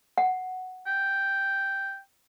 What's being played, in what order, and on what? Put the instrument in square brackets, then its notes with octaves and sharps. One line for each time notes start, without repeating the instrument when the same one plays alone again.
[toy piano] F#5
[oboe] G5